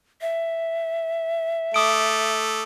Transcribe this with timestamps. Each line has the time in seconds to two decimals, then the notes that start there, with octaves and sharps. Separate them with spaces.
0.21 E5
1.74 A3 D6 D#6 D7